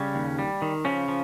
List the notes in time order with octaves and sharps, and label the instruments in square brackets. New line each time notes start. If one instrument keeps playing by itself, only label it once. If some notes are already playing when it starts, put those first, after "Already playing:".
Already playing: [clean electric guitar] C#3 G3 C#4
D#2
G3
D#3
C#3 F3 C#4
F3